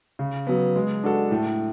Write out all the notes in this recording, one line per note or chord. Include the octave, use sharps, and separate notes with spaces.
C#3
F#3 B3
G#3
D4 F#4 A4
A2